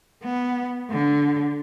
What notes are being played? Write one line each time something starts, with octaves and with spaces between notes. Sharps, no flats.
B3
D3